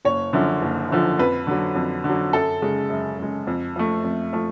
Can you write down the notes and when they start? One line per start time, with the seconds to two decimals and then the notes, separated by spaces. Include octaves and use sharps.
0.05 F#1 C#5
0.33 F#2 D3 F3
0.62 F#1
0.90 F#2 D3 F3
1.19 F2 B4
1.47 D3 F#3
1.76 F2
2.04 D3
2.09 F#3
2.33 F#2 A4
2.62 C#3 G#3
2.90 F#2
3.19 C#3 G#3
3.47 F2
3.76 F3 A3
4.04 F2
4.33 F3 A3